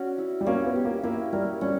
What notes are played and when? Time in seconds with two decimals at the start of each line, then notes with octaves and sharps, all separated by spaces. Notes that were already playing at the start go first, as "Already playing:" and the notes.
Already playing: C#4 F#4 D5
0.18 E4
0.41 G3
0.46 A#3 C#4
0.65 B3
0.76 G4
0.85 A#3
1.03 A#3 E4
1.33 G3 A#4
1.61 G3 C#4